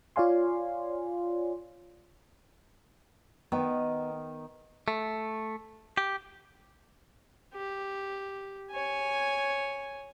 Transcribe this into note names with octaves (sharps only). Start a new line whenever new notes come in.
F4 C#5 D5 F5 G#5 C6
D#3 B3
A3
G4
G4
C#5 G#5